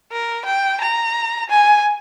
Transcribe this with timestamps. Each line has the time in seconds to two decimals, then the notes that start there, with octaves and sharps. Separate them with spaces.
0.12 A#4
0.46 G5
0.81 A#5
1.50 G#5